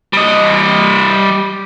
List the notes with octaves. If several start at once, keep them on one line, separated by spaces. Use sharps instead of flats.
G3 D#5